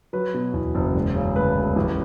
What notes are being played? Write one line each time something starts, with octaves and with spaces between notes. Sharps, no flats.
F#3 B4
B2
E2
F#1
E1
C#3
D2 B4
E1
A1